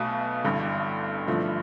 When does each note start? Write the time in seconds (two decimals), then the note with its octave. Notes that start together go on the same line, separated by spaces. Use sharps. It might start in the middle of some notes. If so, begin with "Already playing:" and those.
Already playing: B1 B2 A3
0.44 A1 G2 D3
1.28 A1 G2 D3 F3 A3